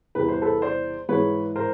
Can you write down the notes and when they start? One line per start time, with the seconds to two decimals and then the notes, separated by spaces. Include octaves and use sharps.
0.15 E2 C3 E3 G3 B4
0.28 C5
0.42 A4 B4
0.62 C5 D5
1.09 G#2 E3 G#3 B4 C#5
1.56 A#4 C5